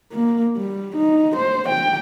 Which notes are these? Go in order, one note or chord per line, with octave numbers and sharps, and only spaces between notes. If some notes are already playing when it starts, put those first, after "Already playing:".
A#3
G3
D#4
C5
G5